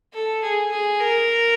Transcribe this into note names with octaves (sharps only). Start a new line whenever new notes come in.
A4
G#4
G#4
A#4